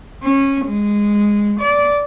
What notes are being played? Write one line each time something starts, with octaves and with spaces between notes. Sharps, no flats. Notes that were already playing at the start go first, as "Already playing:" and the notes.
C#4
G#3
D5